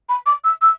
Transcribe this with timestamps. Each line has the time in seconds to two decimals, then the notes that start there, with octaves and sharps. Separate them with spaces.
0.09 B5
0.26 D6
0.44 E6
0.62 E6